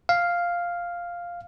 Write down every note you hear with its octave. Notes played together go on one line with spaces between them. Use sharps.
F5